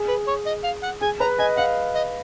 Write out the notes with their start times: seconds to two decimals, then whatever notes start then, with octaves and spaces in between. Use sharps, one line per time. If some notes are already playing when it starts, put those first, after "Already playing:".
Already playing: G#4
0.08 B4
0.27 C#5
0.46 D#5
0.64 F5
0.83 F#5
1.01 G#4 G#5
1.20 B4 A#5
1.39 D#5 G#5
1.57 F5 F#5
1.95 D#5